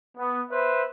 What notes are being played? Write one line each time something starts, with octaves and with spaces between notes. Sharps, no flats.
B3
B4 C5 E5